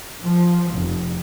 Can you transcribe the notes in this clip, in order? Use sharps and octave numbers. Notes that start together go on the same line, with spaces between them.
F3
F1